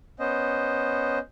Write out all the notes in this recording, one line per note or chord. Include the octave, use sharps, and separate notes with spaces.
B3 C#4 C5 D#5